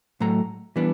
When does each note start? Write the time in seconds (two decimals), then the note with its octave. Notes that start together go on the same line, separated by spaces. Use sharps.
0.20 A2 F#3 A3 A#5
0.76 E3 G3 B3 D4